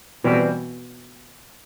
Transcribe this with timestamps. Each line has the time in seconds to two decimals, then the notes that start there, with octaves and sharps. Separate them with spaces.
0.24 B2 E3 G3 C4